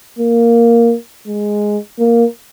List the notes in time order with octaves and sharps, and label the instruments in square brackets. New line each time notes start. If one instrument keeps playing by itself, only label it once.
[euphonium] A#3
G#3
A#3